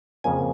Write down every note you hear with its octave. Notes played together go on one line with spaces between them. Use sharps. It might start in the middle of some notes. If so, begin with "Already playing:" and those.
F2 C#3 F3 A#3 C#4 G#5